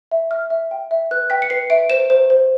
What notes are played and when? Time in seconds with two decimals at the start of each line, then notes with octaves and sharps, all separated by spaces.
0.11 E5
0.31 E5 F6
0.50 E5
0.71 G5
0.91 E5
1.11 B4 F#6
1.30 G5 B6
1.42 C#7
1.50 B4 C7
1.70 E5 D7
1.90 C5 E7
2.10 C5
2.30 C5